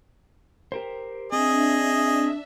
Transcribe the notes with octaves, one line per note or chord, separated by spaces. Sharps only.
G4 A#4 C5
C4 D4 G#4 D#5 E5